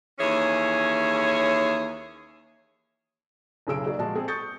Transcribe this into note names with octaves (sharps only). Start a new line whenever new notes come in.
D#2 E3 C#4 G#4 C#5 E5
F#1 B1 C#3 G#4 E6 D7
A#3 D#4 F#4 G#4 D5
A#2 F3 G#3 F#4 A5
C4 G#4 A4
C#6 D#6 G6 A6 C#7